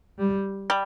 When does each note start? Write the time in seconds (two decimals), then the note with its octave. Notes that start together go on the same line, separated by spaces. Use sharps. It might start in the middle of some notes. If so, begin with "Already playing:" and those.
0.19 G3
0.70 G3